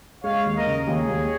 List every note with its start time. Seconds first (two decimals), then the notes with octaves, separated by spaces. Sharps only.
0.24 G#3 C#5 F5
0.45 D#2
0.56 A#4 D#5
0.67 C#3
0.87 D#2 G#4 C#5
1.09 D#2